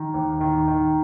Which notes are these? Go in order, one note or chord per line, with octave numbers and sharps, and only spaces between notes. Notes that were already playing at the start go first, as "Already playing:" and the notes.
Already playing: D#3
D#2
D#3
D#3